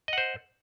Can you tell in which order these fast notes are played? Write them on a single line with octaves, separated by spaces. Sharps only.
D#5 F#5 C5